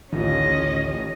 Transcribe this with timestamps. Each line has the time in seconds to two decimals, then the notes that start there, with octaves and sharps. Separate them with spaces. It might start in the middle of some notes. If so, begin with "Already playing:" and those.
0.13 A1 D2 D#3 C#4 D#4 F4 D#5